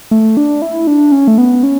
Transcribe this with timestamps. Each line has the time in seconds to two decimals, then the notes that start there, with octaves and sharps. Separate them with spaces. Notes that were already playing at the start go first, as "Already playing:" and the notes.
0.11 A3
0.37 D4
0.62 E4
0.87 D4
1.12 C#4
1.28 A3
1.38 B3
1.63 C#4